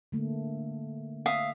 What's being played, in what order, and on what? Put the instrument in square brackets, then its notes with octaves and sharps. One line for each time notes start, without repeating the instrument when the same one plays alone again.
[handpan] D3 A3 A#3
[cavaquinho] E5 F5 D#6